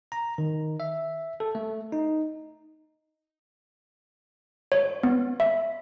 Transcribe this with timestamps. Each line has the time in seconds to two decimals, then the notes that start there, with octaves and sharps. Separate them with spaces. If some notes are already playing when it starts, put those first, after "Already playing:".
0.12 A#5
0.38 D#3
0.80 E5
1.40 A4
1.55 A3
1.92 D#4
4.72 C#5
5.03 B3
5.40 E5